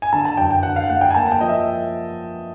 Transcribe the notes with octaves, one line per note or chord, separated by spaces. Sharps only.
G#5
D3 A5
A5
F#2 G5
G5
D3 F#5
F5
A3 F#5
G5
G#5
A#3 A5
G5
F3 D#5
E5